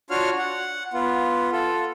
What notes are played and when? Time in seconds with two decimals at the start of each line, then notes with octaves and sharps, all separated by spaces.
0.10 D4 F4 F#4 C#5 F5 F6
0.38 F#5
0.94 B3 F4
1.53 F4 A4